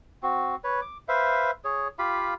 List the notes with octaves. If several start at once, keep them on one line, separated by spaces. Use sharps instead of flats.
C4 F#4
B4 C#5
D6
B4 C5 E5 F5
G#4 C#5
F4 G4 F5 B5